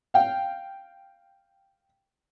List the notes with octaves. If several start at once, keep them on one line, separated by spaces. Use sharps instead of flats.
F5 G5